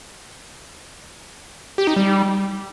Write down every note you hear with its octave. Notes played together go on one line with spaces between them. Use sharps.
G4
D#4
G3